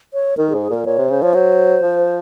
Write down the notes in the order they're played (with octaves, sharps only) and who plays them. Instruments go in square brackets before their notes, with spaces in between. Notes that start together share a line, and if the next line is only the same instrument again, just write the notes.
[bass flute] C#5
[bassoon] D#3 [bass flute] A#4
[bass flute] G#4
[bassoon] G#2
[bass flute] G#4
[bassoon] A#2 [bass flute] A#4
[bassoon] A#2 [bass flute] C#5
[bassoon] C3
[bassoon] C#3 [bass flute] C5
[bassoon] F3 [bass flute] C#5
[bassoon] F#3 [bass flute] C5
[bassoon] F3